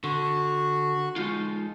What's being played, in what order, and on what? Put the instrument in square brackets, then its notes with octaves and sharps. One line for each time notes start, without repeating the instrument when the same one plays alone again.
[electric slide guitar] D3 [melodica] F#4
[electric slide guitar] G#3 D#4 F4